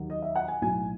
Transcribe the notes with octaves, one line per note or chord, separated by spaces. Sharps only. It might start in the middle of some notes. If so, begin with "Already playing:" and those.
Already playing: D#2 D#3 F#3
D#5
E5
F#5
G#5
B1 A2 F#3 G#5